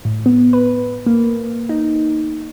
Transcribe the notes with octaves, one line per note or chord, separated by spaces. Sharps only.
A2
B3
B4
A#3
D#4